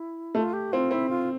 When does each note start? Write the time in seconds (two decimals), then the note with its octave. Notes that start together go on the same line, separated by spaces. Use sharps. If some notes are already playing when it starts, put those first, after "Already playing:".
Already playing: E4
0.35 A3 F4
0.53 G4
0.73 C4 F4
0.91 C4 E4
1.09 F4